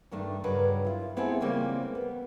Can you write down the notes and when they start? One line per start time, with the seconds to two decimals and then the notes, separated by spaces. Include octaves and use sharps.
0.11 G2 D#3 A3 D4
0.44 G2 C#3 F#3 D4 A#4 B4
0.85 E4 F4
1.16 B3 C4 E4 F4 G#4 A4
1.41 C#3 E3 G3 G#3 A#3 C4
1.95 B3